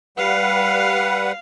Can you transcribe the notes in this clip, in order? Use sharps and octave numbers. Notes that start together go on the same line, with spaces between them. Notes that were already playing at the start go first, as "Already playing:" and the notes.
G3 B4 F5 F#5